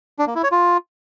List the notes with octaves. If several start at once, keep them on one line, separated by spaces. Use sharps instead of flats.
D4
A#3
E4
C#5
F4